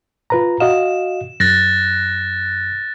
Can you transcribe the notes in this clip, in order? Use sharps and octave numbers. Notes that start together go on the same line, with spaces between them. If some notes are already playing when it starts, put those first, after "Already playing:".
F4 B4 A#5
F#4 D#5 F5 E7
F#2 F#6 A6 A#6